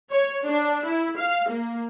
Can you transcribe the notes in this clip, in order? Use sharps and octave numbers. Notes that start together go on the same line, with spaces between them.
C#5
D4
E4
F5
A#3